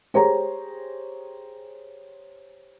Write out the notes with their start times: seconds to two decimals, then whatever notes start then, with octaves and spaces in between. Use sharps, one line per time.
0.14 G4 G#4 C5 C#5 A#5